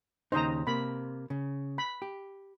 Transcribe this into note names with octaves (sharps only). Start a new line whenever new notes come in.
D#2 C#3 D#4 C5 D#5 A#5
C3 A#3 B5
C#3
B5
G4